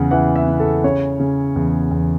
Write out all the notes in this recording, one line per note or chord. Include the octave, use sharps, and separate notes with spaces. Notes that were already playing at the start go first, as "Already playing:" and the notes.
Already playing: E2 C#3 F#5
E3 F#5
E5
C#3
A4
C#3 C#5
C#3
E2
E2